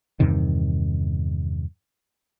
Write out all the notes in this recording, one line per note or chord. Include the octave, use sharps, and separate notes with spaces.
E2 G2 C3 D#3